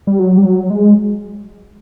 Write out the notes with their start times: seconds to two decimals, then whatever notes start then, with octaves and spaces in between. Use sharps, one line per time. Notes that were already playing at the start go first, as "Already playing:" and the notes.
0.07 G3
0.19 F#3
0.38 G3
0.45 F#3
0.70 G#3